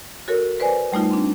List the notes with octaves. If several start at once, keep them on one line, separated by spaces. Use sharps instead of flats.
F#4 A4 A#4 C#5
B4 C5 D5 G#5
G3 A3 D#4 F4
C4 D4